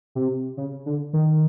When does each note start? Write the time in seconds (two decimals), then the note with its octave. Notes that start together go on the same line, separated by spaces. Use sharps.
0.15 C3
0.57 C#3
0.86 D3
1.13 D#3